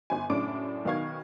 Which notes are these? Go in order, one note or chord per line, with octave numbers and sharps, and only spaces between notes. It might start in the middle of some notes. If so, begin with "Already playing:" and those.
G1 G#5
F#2 A2 C#3 D4 D6 D7
B1 D#3 B3 F5 C#6 G#6